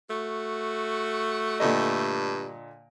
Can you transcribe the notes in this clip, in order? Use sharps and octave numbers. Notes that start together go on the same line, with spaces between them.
A3 F#4
G2 A#2 D3 D#5